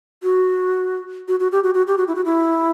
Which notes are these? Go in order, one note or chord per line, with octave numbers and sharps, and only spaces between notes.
F#4
F#4
F#4
G4
F#4
F#4
G4
F#4
E4
F#4
E4